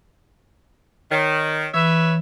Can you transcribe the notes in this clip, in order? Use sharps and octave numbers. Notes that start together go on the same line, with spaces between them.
D#3 C#5
E3 B4 C#5 E5